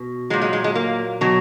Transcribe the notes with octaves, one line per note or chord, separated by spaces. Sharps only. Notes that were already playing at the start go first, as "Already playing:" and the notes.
Already playing: B2
A#2 F#3 G#3
G#3
G#3
G#3
A#3
B2 F#3